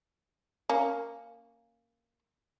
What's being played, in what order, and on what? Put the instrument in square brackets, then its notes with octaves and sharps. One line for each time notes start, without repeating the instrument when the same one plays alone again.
[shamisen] A#3 C#4